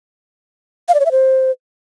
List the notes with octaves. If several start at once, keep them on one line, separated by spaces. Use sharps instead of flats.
F5
D5
C#5
E5
C5